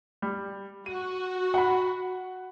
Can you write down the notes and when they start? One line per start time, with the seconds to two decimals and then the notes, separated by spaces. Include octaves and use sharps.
0.22 G3
0.86 F#4 D#7
1.54 F#5 B5